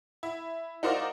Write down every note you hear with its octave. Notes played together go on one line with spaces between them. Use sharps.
E4
D#4 F#4 A#4 C5 D5 F5